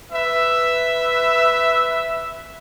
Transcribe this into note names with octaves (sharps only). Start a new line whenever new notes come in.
B4 E5